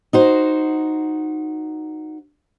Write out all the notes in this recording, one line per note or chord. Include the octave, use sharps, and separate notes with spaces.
D#4 F#4 C5